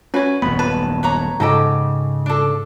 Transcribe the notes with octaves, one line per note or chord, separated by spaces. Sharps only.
C#4 F#4 B4 C#5
D#1 F#2 B3 B5
B4 A5
B4 C#5 A#5
G#2 C#3 G4 A4 D#5
D4 A4